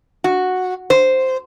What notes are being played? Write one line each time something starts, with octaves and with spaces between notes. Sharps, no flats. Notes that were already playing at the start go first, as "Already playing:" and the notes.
F#4
C5